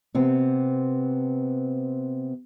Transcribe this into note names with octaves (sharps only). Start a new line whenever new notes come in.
C3 B3 C4